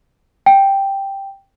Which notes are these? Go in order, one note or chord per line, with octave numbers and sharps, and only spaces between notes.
G5